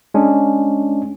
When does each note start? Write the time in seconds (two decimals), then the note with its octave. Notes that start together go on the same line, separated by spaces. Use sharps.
0.14 G#3 C#4 D4